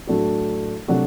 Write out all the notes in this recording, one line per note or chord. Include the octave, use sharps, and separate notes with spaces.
A2 F#3 A3 D4 F#4
C3 F#3 A3 D4 F#4